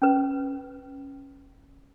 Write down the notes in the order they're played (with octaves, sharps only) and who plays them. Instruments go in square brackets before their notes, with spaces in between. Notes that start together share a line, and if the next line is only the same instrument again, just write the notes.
[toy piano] C#4 B4